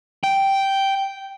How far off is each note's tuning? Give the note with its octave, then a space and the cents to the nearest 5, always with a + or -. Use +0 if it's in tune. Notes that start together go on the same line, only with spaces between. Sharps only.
G5 -5